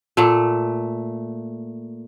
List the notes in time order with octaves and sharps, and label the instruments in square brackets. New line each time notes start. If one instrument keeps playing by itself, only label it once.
[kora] A#2 A3